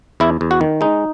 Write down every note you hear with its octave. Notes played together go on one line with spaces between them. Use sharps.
E2 E4
E2
F#4
D#3
G#3 D#4